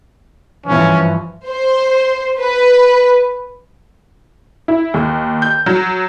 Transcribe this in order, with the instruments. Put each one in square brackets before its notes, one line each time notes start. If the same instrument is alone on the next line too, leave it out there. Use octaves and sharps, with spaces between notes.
[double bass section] G2 E3 F3 [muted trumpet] C#4
[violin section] C5
B4
[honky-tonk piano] E4
D#2
G6
F#3